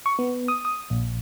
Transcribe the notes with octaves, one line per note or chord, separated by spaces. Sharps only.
C#6
B3
D#6
D#6
A#1